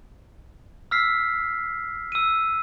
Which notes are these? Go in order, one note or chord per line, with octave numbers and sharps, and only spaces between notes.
E6 F6 B6 C7
E6 D#7